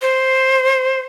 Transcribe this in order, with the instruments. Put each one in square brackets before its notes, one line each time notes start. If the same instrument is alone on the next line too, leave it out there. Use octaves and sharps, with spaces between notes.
[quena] C5